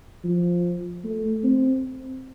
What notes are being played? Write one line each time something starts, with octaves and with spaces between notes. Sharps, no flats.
F3
A3
C4